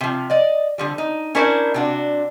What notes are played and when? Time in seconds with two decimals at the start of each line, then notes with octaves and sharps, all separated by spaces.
0.01 C3 F3
0.30 D5 D#5
0.78 D3 F3 G3
0.98 D#4
1.35 C#4 D4 E4 A#4 C5 D5
1.74 C3 D4 F#4